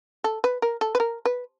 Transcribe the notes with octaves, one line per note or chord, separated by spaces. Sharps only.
A4
B4
A#4
A4
B4
A#4
B4